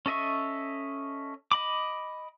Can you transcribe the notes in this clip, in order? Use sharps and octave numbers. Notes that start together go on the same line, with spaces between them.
C#4 A4 D#5 E5 C#6
D#5 B5 D6